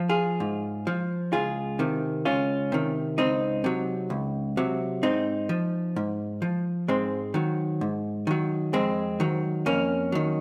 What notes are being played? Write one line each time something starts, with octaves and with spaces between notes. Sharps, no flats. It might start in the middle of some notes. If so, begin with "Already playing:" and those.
Already playing: F3
F4 G#4
G#2
F3
C#2 F4 G#4
C3 D#3
C#2 C#4 F4
C3 D#3
C#2 C4 D#4
C3 F#3
C#2
C3 F#3
G#2 C4 D#4
F3
G#2
F3
G#2 G#3 C4
D#3 F#3
G#2
D#3 F#3
F2 G#3 C4
D#3 F#3
F2 A#3 C#4
D#3 F#3